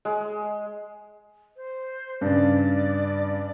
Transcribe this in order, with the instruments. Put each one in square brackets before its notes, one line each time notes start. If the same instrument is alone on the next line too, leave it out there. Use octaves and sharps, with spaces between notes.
[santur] G#3
[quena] C5
[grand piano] G2 C#3 [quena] D5